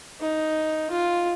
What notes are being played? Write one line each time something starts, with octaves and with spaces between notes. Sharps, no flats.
D#4
F4